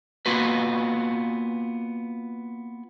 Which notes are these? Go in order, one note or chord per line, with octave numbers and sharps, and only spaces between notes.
A#3 B3 F4 F#4 B4